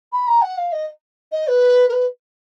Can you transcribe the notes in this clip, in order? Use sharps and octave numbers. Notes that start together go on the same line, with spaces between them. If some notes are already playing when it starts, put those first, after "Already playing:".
B5
A#5
F#5
F5
D#5
D#5
B4
A#4
B4